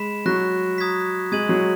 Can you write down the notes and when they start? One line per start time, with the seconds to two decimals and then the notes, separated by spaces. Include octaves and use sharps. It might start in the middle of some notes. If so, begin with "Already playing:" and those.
Already playing: G#3 B5 B6 E7
0.25 F#3 C#6 F#6 A#6
0.78 A#5 D#6 G#6 B6
1.32 G#3 D#6 G#6 D#7 F#7
1.49 F#3